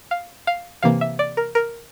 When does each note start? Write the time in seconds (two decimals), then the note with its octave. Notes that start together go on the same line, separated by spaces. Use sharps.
0.11 F5
0.47 F5
0.83 C3 E3 A#3 F5
1.01 E5
1.19 D5
1.37 A#4
1.55 A#4